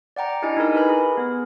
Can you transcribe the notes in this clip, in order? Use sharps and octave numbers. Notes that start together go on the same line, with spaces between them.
D5 F#5 G5 A#5
D4 E4 G4 D#5 G#5 A#5
D#4 E4 G#4 A#4 G#5
G4 A#4 B4 G#5 B5
G#4
B3 G#4